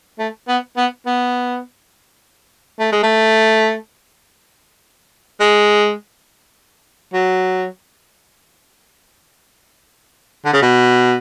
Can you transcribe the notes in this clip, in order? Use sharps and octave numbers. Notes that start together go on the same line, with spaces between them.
A3
B3
B3
B3
A3
G#3
A3
G#3
F#3
D3
C#3
B2